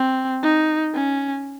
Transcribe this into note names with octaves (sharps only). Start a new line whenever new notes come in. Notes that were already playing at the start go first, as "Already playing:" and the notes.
Already playing: C4
D#4
C#4